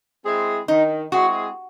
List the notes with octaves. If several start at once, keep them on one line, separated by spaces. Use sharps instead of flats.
G#3 C4 E4 G#4
D#3 D#4
G#3 C4 E4 F#4 G#4